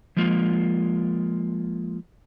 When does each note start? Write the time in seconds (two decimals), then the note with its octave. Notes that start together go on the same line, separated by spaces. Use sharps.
0.17 F3 G#3 A#3 F4